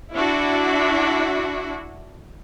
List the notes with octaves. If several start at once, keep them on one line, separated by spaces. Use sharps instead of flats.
D4 E4 F#4